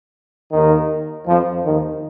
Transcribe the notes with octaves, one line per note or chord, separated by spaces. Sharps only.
D#2 D#3
F2 F3
D#2 D#3